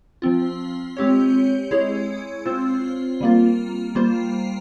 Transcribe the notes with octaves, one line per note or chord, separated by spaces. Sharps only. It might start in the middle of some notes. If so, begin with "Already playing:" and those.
F3 C4 F4
G#3 C4 G4 C#5
G#3 E4 G#4 C#5
C4 F4 C5
G3 A#3 F4
G3 A#3 F4 C5